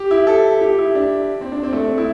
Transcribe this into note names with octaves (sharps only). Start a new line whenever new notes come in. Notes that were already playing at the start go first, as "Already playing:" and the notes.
Already playing: G4
E4
A4
G4
E4
D4
C4
D4
C4
A3
C4
E4